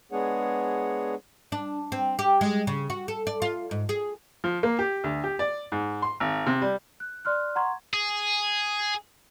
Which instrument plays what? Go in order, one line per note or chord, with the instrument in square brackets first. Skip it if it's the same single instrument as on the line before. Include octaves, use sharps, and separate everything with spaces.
[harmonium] G#3 B3 D4 G#4 C#5 F#5
[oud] D4
C4
G4
G#3
C#3
F#4
A4
D5
F4
G#2
G#4
[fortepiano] F3
A#3
G4
D2
G4
D5
G#2
C6
G#1
C3
G3
[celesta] F#6
D5 C6 F6 F#6
F#5 A#5 C6 C#6 G#6
[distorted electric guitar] G#4